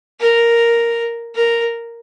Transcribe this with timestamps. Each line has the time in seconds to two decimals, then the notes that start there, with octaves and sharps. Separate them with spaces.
0.19 A#4
1.35 A#4